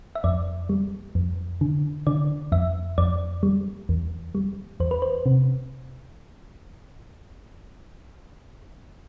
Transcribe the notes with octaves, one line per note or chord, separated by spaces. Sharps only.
E5
F2 D5
G3
F2
D3
D3 D5
F2 E5
F2 D5
G3
E2
G3
E2 C5
B4
C5
C3